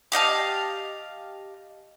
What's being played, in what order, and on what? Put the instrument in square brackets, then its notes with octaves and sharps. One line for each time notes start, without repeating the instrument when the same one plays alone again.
[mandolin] G4 D#5 F5 A5